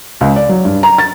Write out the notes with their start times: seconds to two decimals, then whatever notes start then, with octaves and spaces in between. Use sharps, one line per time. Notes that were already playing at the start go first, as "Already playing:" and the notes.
0.21 C#2
0.36 D5
0.49 F#3
0.65 G2
0.83 A#5
0.98 A6